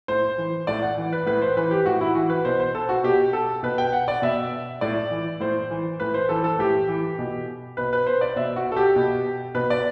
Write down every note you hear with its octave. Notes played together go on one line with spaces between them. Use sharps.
A2 C5
E3
A2 D5
F#5
E3
B4
A2 B4
C5
E3 B4
G4
A2 F#4
E4
E3 F#4
B4
B2 C5
C5
A4
F#4
B2 G4
A4
B2 B4
G5
F#5
D5
B2 E5
A2 D5
E3
A2 C5
E3
A2 B4
C5
E3 A4
A4
A2 G4
E3
B2
B2 B4
B4
C5
D5
B2 E5
F#4
A4
G4
B2
B2 B4
D5